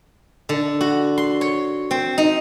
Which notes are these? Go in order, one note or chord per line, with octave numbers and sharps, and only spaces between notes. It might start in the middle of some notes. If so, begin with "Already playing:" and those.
D3
F#4
C6
C#5
C4
D#4